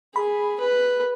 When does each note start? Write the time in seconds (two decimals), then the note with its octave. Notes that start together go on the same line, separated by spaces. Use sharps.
0.15 G#4 B5
0.60 B4